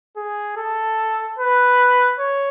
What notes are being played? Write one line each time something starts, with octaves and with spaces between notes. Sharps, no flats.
G#4
A4
B4
C#5